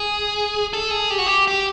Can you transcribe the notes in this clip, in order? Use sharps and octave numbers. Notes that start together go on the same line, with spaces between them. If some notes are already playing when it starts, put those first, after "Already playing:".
Already playing: G#4
A4
G#4
G4
F#4
G4
G4